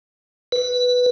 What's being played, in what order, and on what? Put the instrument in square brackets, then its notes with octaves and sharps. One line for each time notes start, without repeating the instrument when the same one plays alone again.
[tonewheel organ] B4